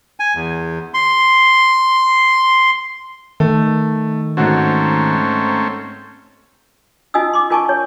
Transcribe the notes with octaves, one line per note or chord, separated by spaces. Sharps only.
G#5
E2
C6
D#3 A3
G#2 A3 C4 C#4 F#4
D#4 F4 D#5 G#5 D#6 E6
C6 D6
F4 A#4 G#5 A5 C#6
C#5